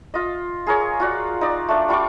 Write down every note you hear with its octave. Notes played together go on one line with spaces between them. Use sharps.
F4 D#5
G#4 A#4 C#5
F4 F#4 D5
D#4 D5
A3 D4 D5
G3 F4 C#6 D6